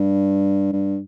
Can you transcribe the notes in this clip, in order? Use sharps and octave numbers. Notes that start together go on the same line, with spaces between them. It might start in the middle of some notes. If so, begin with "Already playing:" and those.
Already playing: G2
G2